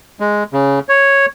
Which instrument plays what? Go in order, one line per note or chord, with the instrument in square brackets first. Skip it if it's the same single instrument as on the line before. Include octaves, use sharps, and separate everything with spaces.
[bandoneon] G#3
C#3
C#5